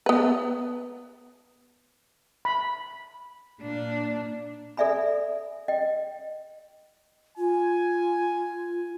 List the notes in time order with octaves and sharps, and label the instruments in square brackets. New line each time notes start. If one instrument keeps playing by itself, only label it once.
[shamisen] B3 B4
[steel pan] B5
[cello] A#2 D4
[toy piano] A4 D5 E5 G#5 B5
D#5 G5
[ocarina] F4 [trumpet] G#5